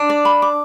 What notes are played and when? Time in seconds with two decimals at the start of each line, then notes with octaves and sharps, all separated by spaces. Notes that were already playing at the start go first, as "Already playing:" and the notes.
Already playing: D4
0.10 D5
0.25 B5
0.42 D6